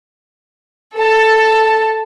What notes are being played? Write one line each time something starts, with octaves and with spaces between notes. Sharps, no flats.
A4 A5